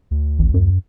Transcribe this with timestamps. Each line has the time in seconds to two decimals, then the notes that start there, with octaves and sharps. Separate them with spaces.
0.11 D2
0.39 A1
0.54 F#2